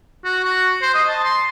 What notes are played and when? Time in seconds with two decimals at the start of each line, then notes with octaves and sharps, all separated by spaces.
0.24 F#4
0.44 F#4
0.82 C5
0.94 D#5
1.09 A5
1.24 C6